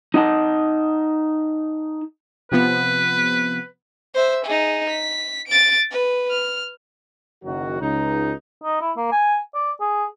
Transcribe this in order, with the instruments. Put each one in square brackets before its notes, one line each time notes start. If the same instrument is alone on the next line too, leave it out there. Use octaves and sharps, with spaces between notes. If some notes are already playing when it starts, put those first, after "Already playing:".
[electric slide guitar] D#4 D#5 F#5 A5
[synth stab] C3 F3 B3 [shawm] B4
[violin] C5 E5
D#4 G#4
B6
A6 D7
B4
F6
[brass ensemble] F#1 D#3 F#3 F#4
C#2 D#4
[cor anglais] D#4
E4
A#3
G#5
D5
G#4